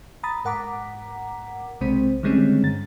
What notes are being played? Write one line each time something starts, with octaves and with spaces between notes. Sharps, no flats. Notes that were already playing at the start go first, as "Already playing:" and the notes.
A#5 B5 D#6 A6
G#2 A#4 F#5 A#5 D6 B6
B1 C3 G#3 C4 C5
D3 D#3 G3 G#3 C4 C#4
G2 A6